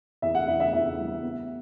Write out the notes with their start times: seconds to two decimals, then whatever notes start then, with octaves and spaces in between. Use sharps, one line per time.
0.22 E2 E5
0.35 F#5
0.48 E2 E5
0.60 E5
0.73 E2 E5
0.98 G3
1.23 B3